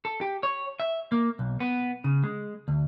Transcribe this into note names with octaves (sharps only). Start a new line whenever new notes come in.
A4
G4
C#5
E5
A#3
B1
B3
C#3
G#3
D2